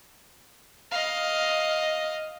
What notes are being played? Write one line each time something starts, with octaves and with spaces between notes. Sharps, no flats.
D#5 F5